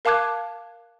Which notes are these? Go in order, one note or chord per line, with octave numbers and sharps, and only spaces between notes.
A#4 F5 A5 D6 F#6 G#6